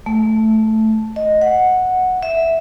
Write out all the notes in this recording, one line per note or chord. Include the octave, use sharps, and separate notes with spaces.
A3
D#5
F#5
E5